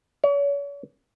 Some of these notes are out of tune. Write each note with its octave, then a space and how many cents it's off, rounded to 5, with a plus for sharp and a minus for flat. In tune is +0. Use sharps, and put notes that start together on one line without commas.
C#5 +40